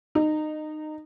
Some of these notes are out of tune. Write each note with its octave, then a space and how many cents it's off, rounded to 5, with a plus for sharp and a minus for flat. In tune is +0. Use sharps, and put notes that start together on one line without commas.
D#4 -25